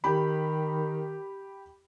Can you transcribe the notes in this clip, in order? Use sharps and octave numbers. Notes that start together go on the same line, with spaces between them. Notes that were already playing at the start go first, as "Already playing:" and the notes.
D#3 G4 B5